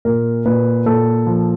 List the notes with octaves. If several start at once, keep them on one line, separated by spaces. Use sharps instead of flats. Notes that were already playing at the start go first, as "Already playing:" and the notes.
A#2 A#4
A#2 B4
A#2 A4
F3